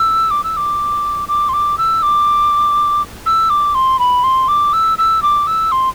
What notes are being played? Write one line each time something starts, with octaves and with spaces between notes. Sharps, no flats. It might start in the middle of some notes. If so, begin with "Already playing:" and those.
Already playing: E6
D6
E6
D6
D6
C6
D6
E6
D6
E6
D6
C6
B5
C6
D6
E6
E6
D6
E6
C6